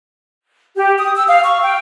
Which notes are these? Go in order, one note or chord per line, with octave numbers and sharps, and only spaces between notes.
G4
D#6
E6
F5
C#6
G5